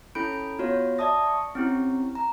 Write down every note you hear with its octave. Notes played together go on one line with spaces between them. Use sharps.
C#4 E4 A4 B5 G6 D7
B3 F4 F#4 C#5
D5 E5 A5 D#6 A#6
C#6
C4 C#4 E4 G4
A#5